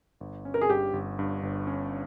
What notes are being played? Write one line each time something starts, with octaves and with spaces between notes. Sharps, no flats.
G1
C#4
A#4
G#4
G2 G4
G1
G2
G1
C#4